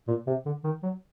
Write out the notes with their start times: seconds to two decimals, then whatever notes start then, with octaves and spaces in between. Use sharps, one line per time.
0.08 A#2
0.27 C3
0.46 D3
0.64 D#3
0.83 F#3